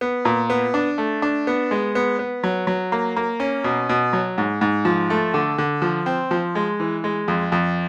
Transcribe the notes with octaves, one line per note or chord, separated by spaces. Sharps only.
B3
A#2
B3
D4
A3
D4
B3
G#3
B3
B3
F#3
F#3
A#3
A#3
C#4
B2
B2
F#3
G#2
G#2
F3
A3
D3
D3
F3
C4
F3
G#3
E3
G#3
F2
F2